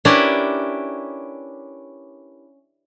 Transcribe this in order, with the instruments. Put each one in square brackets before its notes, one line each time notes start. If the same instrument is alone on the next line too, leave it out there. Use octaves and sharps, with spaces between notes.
[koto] C#4 D4 E4 G4 A#4 B4